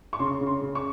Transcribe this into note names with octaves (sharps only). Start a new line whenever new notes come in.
C#6
C#3 C6
C#3
C6
C#3
C#6